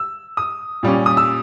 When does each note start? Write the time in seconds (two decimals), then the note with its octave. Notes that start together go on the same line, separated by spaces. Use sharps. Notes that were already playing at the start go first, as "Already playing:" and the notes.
Already playing: E6
0.37 D#6
0.83 A#2 G3 C#4
1.06 D#6
1.17 E6